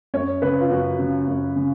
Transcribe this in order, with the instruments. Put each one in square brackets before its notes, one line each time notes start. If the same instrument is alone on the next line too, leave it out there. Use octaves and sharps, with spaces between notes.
[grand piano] F#2 C#5
C#3 B4
F4
F#2 F#4
C#3
F#2
C#3